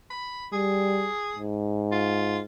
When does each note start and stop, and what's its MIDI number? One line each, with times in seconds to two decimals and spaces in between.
0.11 0.46 83
0.53 1.09 55
0.53 1.38 68
1.36 2.43 44
1.92 2.39 65